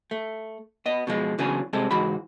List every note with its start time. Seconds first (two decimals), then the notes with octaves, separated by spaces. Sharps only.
0.11 A3
0.86 B3 D#5
1.07 B2 F3 G#3
1.39 C#3 E3 F#3 B3 D4 G#4
1.73 C2 C3 G#3 C4 A4
1.91 C#2 G#2 E3 G#3 F#4 B5